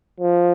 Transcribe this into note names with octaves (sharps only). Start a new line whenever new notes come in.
F3